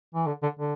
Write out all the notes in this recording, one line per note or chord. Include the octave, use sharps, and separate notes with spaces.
E3
D3
D3
D3